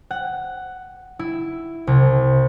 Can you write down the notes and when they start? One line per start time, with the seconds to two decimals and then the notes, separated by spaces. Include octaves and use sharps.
0.11 F#5
1.19 E4
1.87 C2